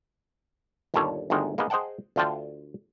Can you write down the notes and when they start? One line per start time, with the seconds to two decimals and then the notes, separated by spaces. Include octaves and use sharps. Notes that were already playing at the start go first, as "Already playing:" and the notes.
0.94 G1 D#2 A#2 G3 A4 C#5
1.30 G1 D2 D#3 G#3 D#4 G5
1.58 A#3 B3 D#4 G#4 D#5
1.70 G#4 C5 D#5 F#5 G5 A5
2.16 D2 D3 F4 G5 A5